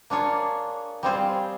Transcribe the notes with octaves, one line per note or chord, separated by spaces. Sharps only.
A#3 D4 F4 G#4 C#5
G3 C4 F4 G#4 C5